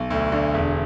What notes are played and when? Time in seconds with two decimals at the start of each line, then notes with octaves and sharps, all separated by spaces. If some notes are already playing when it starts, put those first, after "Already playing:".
Already playing: B1
0.10 D2
0.32 D3
0.54 E1